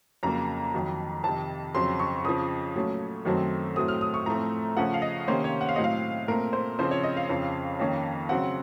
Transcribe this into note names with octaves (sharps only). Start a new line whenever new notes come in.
F2 C#3 F#3 A#3 A#5
F2 D#3 F#3
F2 C3 D#3 A5
F2 C#3 F#3 C4 C6
C#6
F2 C#3 F3 D#6
A#2 F#3 A3 C#4
F#2 D#3 F#3 A3 C4
A2 F#3 A3 C4 D#6
F6
D#6
C#6
A2 F3 A3 C4 A#5
C#3 F3 A3 C#4 F#5
F5
D#5
C3 D#3 A#3 C#4 C5
C#5
F#5
F5
A2 F#3 C4 D#5
F5
A#2 A3 C4 A#4
C5
C#3 F3 C4 C5
C#5
D#5
F5
F2 C#3 F3 C4
F2 D#3 A#3 C#4
C#3 F#3 C4 F#5